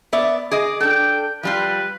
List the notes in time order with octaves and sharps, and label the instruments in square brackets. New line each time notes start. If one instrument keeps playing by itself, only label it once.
[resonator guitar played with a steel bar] B3 D5 E5
[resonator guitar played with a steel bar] G#4 D#5 [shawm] D6
[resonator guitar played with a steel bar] D4 A4 [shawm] G5
[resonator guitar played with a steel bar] F3 G3 F4 [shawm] B4